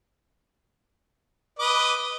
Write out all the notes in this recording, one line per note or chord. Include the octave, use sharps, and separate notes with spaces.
B4 D#5 D6